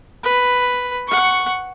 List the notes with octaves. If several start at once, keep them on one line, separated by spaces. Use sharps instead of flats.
B4
F#5 C#6